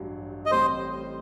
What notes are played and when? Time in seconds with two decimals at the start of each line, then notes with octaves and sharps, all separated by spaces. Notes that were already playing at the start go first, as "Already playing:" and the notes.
Already playing: A1 G2 F#3
0.46 D#5
0.51 A1 A2 G3 C4 C5